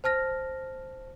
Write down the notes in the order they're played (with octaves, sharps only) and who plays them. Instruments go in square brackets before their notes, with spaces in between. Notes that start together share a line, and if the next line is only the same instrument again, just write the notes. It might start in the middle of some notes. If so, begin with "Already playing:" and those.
[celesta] C5 A5 F6 A#6